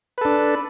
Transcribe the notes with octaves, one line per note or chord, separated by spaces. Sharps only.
D4 A4 B4